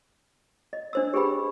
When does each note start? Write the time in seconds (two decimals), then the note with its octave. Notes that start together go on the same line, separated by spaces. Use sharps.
0.73 D#5
0.93 D4 C5 E6
1.14 G4 G#4 B4 G5 B5